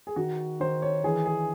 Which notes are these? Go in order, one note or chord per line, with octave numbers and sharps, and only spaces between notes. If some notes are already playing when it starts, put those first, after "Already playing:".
G#4
D#3 F#4
D#3 C5
C#5
E3 G#4
G#4